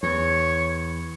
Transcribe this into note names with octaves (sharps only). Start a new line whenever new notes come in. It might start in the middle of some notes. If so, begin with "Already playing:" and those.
E2 C#5